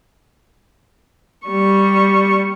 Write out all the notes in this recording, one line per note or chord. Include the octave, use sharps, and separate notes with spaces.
G3 C#6